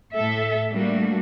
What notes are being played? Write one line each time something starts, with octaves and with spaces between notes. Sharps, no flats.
A2 A4 E5
G3 A3 A#3 D4 F#4